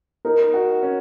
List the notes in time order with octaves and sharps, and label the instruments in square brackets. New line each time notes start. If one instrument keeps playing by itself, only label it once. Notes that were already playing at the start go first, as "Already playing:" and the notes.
[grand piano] D#4 [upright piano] A#4
[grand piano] F#4
C#4